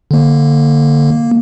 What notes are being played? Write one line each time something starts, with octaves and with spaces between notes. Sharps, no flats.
D3 A#3
A#3